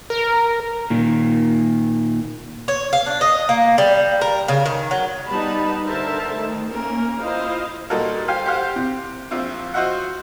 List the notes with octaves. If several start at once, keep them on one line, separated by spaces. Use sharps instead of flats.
A#4
A#2 D#3
C#5
F5
D4
D#5
A#3
G3
A#4
C#3
D#3
F#3
G3 B3 D#4 A5 B5
D3 A#4 C5 E5 A5
D#3 A3
A#3 C#4 A#4
E4 F4 C5 D#5 F5
A#2 G3 D#4 F#4 A4 A#4
G4 C5 F5 G5 G#5
G4 C5 F5 F#5
C3
A#1 C4 F4 E5
F4 F#4 C5 D#5 E5 F#5